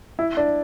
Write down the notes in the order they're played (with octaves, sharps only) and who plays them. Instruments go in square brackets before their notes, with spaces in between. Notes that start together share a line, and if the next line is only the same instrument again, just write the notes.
[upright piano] E4
D4